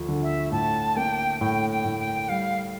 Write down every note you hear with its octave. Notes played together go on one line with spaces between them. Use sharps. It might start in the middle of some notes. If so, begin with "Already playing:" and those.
Already playing: D2 F3
D3
E5
A2 A5
A#3 G5
A2 G5
G5
A2
G5
G3 F5